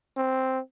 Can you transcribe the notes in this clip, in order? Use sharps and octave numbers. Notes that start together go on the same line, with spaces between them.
C4